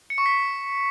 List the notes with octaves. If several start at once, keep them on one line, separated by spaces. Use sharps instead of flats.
C#7
C#6
B6